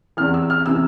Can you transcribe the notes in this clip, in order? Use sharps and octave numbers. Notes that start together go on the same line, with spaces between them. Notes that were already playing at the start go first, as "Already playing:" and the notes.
E2 C3 E3 F6
E6
F6
C3 E3 E6